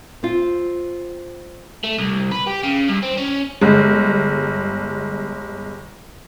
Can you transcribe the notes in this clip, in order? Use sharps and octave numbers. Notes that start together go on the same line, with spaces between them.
C4 F4
A3
C2
B4
G4
C#3
G2
C4
C#4
G1 G#3